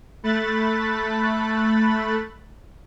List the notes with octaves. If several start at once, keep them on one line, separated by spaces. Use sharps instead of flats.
A3 B5 F#6 A6